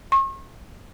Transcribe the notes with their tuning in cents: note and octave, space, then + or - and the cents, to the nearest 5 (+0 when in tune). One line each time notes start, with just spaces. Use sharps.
C#6 -45